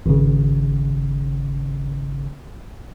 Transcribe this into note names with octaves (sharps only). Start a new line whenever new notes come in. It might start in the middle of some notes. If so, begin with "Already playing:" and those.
G#1 C#3